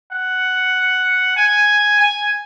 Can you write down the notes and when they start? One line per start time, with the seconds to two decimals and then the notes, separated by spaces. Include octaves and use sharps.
0.13 F#5
1.37 G#5
1.99 G#5